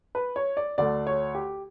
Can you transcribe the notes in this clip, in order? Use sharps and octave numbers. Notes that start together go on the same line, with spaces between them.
B4
C#5
D5
D2 D3 A3 D5
C#5
G4